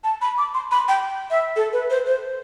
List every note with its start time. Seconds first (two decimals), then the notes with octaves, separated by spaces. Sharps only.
0.04 A5
0.21 B5
0.38 D6
0.54 C6
0.71 B5
0.88 G5
1.31 E5
1.56 A4
1.73 B4
1.90 C5
2.06 C5